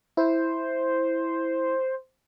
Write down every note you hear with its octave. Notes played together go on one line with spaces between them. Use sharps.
E4 C5